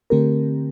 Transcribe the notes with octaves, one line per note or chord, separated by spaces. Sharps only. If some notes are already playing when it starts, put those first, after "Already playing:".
D3 A3 C4 G4 A#4